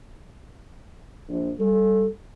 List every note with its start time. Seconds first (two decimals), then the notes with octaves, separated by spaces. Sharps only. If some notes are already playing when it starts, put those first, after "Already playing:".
1.29 A#1
1.60 G3 A4